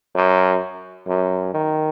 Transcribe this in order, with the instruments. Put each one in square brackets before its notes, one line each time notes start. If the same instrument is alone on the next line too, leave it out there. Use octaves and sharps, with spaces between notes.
[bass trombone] F#2
F#2
D#3